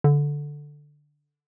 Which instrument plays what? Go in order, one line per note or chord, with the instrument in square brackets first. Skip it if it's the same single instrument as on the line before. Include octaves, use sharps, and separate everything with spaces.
[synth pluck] D3